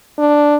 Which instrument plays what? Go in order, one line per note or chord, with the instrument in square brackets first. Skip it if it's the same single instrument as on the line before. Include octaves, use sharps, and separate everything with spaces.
[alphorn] D4